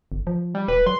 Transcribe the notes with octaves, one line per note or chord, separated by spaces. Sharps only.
G1
F3
G3
D#1 B4
F#3 C6